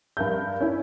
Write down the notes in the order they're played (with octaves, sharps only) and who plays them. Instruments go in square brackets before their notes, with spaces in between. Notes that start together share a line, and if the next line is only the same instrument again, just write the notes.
[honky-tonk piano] G2 A#4 E5 G6
C#4 D4 E4